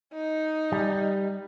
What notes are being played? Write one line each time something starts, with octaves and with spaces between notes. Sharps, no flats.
D#4
G3